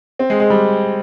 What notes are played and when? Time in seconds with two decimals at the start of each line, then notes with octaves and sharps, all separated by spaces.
0.19 C4
0.30 G#3
0.40 G#3
0.50 G3